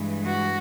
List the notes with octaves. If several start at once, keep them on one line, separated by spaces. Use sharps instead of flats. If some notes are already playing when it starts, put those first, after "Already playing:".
Already playing: G2 E3 G#3
F#4